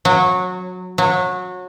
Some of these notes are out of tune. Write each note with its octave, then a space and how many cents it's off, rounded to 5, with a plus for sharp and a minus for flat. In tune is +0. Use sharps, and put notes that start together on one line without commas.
F#3 -20
F#3 -25